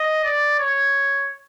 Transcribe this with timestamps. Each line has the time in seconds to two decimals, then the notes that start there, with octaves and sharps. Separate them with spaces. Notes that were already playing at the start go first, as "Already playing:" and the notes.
Already playing: D#5
0.24 D5
0.59 C#5